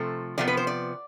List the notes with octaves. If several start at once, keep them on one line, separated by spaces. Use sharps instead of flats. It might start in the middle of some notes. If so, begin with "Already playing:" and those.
Already playing: C3 F3 A3 A4
C3 F3 B3 D5
B4
C5
D5